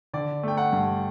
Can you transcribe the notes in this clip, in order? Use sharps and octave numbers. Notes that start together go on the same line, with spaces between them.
D3 D5
A3 G5
F#5
G2